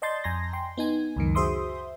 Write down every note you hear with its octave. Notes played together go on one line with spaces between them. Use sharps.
D5 D#5 A5 C6 G6 A6
F2 G#5 A#5 C6 A#6
G5 C6
B3 D#4 G#5
C#2 F#2 D#3
F#4 G#4 C5 E5 C6 D#6